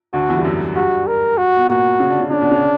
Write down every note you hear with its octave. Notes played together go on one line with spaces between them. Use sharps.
D2 D3 F#4
E2 E3
G3
F#2 F#3
G2 G3 F#4
A#4
F#4
B3
A#2 A#3 F#4
C#3 C#4
D3 D4
C#3 C#4
C#3 C#4 D4
B2 B3
C#3 C#4